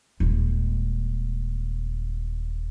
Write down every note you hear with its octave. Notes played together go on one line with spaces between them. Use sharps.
D#1 G#3